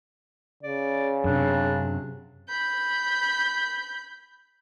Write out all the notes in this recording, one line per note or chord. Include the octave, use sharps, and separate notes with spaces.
C#3 D5
F#2 C3 D4
B5 G6